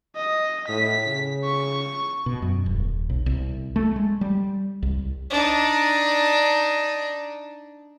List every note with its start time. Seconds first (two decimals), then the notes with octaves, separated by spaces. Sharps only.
0.16 D#5
0.68 A2 B6
1.06 C#3
1.45 C#6
2.26 B2
2.42 F#2
2.66 D#1
3.09 B1
3.26 C2
3.76 A3
3.96 G#3
4.21 G3
4.82 C2
5.30 D4 D#4